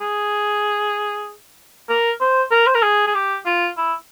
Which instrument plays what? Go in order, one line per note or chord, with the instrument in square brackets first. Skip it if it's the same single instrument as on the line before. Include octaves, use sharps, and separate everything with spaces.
[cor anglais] G#4
A#4
C5
A#4
C5
A#4
G#4
G#4
G4
F4
E4